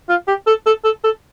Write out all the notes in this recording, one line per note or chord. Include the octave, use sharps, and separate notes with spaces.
F4
G4
A4
A4
A4
A4